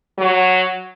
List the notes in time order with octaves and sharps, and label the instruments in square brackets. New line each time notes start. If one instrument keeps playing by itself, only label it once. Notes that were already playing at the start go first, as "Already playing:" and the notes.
[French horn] F#3